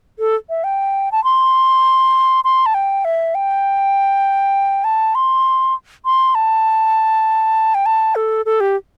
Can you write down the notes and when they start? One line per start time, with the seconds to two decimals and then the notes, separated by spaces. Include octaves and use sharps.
0.19 A4
0.50 E5
0.64 G5
1.12 A5
1.24 C6
2.44 C6
2.66 A5
2.74 G5
3.05 E5
3.35 G5
4.84 A5
5.15 C6
6.05 C6
6.35 A5
7.75 G5
7.86 A5
8.15 A4
8.46 A4
8.60 G4